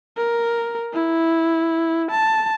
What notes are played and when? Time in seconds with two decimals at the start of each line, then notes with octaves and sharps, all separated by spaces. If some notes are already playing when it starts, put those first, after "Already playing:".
0.17 A#4
0.94 E4
2.11 A5